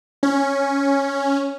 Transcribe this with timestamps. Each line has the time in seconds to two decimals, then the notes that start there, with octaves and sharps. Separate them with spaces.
0.23 C#4